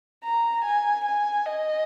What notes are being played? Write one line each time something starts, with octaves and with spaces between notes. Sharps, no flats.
A#5
G#5
G#5
D#5